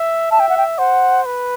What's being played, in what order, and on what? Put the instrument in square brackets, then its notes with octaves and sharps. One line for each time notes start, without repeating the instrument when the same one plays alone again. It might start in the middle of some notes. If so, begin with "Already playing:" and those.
Already playing: [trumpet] E5
[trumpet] E5 [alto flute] A5
[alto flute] G5
F#5
G5
[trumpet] C5 [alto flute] F#5
[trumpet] B4